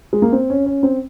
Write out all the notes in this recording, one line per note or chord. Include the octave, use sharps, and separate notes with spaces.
G#3
A#3
C4
C#4
C#4
C4